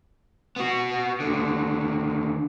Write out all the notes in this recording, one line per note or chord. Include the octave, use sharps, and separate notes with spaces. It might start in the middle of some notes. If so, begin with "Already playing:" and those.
B3 F#4
D#2 D3